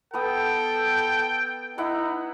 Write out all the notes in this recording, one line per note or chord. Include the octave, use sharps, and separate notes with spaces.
B3 A4 G5 B5 D#6
D#4 E4 E5 F#5